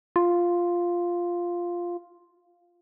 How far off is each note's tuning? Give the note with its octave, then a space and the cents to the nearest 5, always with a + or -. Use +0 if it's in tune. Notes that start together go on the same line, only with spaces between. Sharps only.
F4 +0